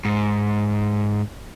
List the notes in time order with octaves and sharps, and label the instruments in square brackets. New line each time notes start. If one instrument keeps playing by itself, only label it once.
[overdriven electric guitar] G#2